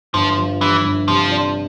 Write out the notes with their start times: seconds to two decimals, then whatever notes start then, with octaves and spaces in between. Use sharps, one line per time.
0.14 G1 F3
0.37 F3
0.61 G2 E3
0.85 G1
1.08 C3 F3
1.32 D4